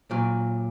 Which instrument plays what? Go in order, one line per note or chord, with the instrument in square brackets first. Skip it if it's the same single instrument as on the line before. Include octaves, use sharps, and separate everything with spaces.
[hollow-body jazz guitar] A#2 F#3